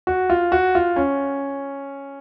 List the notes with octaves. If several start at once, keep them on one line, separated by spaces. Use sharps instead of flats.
F#4
F4
F#4
F4
C#4